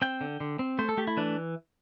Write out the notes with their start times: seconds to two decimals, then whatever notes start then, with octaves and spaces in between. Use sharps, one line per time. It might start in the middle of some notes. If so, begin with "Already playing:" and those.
0.02 C4 G5
0.21 D3
0.40 D3
0.59 C4
0.79 A3 C5
0.89 A4
0.97 A3 G4
1.07 E4
1.17 E3 D4